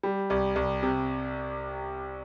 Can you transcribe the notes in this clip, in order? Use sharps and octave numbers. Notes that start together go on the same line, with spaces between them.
G3
C2
C2
C3